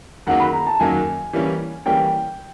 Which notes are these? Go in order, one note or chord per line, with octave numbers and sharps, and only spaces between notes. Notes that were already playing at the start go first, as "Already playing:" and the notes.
F#2 D#3 F#3 A#3 F#5
B5
A#5
A5
F#2 D#3 F#3 A#3 G#5
E3 G3 A#3 C#4
E3 G3 A#3 C#4 G5